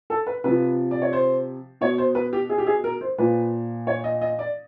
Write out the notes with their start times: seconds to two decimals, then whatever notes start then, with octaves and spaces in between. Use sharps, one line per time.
0.10 A4
0.27 B4
0.44 C3 F3 B4
0.91 D5
1.02 C#5
1.13 C5
1.81 B2 C#5
1.98 C5
2.15 B4
2.33 G4
2.49 G#4
2.58 G4
2.66 G#4
2.84 A#4
3.01 C5
3.18 A#2 F3 B4
3.87 C#5
4.04 D#5
4.21 D#5
4.39 D5